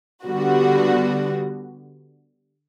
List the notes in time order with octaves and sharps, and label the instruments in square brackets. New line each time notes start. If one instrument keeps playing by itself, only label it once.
[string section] D3 G3 B3 F#4